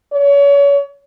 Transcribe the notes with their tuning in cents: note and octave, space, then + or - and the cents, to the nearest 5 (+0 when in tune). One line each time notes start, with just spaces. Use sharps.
C#5 +35